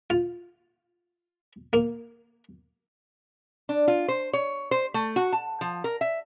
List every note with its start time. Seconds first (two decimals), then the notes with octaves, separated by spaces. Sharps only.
0.10 F4
1.73 A#3
3.69 D4
3.88 F4
4.08 C5
4.33 C#5
4.71 C5
4.94 A3
5.16 F#4
5.33 A5
5.61 F3
5.84 A#4
6.01 E5